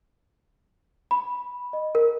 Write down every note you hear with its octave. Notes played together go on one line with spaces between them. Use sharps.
B5
D#5
A#4